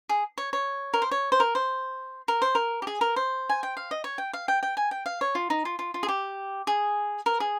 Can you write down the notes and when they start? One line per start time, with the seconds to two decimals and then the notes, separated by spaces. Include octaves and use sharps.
0.09 G#4
0.38 C#5
0.53 C#5
0.94 A#4
1.02 C5
1.11 C#5
1.32 C5
1.40 A#4
1.55 C5
2.28 A#4
2.42 C5
2.55 A#4
2.82 G4
2.87 G#4
3.01 A#4
3.16 C5
3.50 G#5
3.63 G5
3.77 F5
3.91 D#5
4.04 C#5
4.18 G5
4.33 F5
4.48 G5
4.63 G5
4.77 G#5
4.91 G5
5.06 F5
5.21 C#5
5.35 F4
5.50 D#4
5.65 F4
5.79 F4
5.94 F4
6.03 G#4
6.08 G4
6.67 G#4
7.26 A#4
7.40 G#4